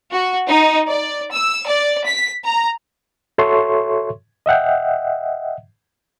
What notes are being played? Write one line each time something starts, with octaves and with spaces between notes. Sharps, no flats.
F#4
D#4
D5
E6
D5
B6
A#5
F#4 A4 C#5 E5 C6 C#6
D#5 E5 F#5 G5